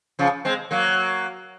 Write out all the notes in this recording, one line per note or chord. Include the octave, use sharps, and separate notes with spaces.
C#3 F3
G#3 C4
F#3 A#3